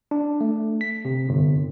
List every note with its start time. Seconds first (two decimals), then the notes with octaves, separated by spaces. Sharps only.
0.11 D4
0.41 A3
0.81 B6
1.05 C3
1.29 G1